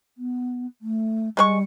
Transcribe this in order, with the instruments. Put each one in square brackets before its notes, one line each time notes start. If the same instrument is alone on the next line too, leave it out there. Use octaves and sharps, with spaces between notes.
[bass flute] B3
A3
[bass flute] G3 [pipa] G#3 B4 C#6